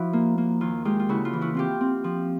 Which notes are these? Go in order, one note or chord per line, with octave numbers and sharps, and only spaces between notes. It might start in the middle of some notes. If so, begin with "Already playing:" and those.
Already playing: F3 E4 F#4
A#3
A#3
D#2 F4
G#3 F4 G4
F4
C#3 E4 F#4
F4
E3
E4 F#4
C4 F4 G4
C4
F3